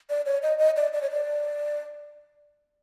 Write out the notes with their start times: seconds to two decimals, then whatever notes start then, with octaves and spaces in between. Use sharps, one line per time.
0.10 D5
0.26 C#5
0.42 D#5
0.59 D#5
0.76 D5
0.93 D5
1.02 C#5
1.11 D5